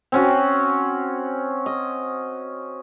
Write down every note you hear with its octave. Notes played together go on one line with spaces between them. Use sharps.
C4 C#4 F#4
D#5